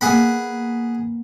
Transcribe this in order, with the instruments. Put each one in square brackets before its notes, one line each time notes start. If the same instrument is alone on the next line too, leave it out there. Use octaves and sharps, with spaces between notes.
[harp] A#3 B3 [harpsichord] G#4 F#5 B5